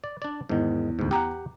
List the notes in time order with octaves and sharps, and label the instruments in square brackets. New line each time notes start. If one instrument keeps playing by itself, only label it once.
[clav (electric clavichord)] D5
D4 D5
[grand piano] E2 [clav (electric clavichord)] G#2 D#3
[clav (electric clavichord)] D2 G#2
[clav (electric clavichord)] G4 F#5 [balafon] G5 A#5